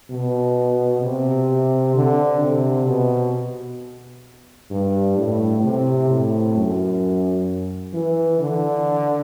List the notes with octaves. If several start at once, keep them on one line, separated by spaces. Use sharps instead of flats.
B2
C3
D3
C3
B2
G2
A2
C3
A2
F#2
E3
D3